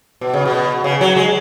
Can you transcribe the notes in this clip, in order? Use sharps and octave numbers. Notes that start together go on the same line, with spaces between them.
B2
C#3
B2
C#3
F#3
G#3